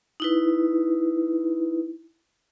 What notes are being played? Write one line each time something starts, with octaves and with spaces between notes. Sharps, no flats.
D#4 E4 B4